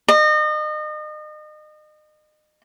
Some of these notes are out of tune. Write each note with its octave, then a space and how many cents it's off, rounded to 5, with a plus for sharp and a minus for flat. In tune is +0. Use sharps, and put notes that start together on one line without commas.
D#5 -35